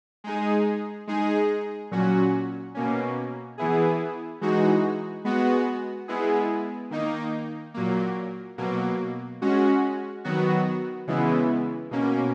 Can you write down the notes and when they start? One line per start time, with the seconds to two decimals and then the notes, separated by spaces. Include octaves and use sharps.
0.24 G#3 D#4 G#4
1.07 G#3 D#4 G#4
1.91 A#2 F#3 C#4 F#4
2.75 B2 A#3 C#4
3.58 E3 B3 E4 G#4
4.41 E3 G#3 D#4 F#4
5.25 G#3 B3 F#4
6.08 G#3 B3 E4 G#4
6.91 D#3 A#3 D#4
7.74 A#2 F#3 A#3
8.58 B2 F#3 A#3
9.42 G#3 C#4 F#4
10.24 D#3 F#3 B3 F#4
11.07 C#3 E3 G#3 B3 E4
11.91 B2 A#3 C#4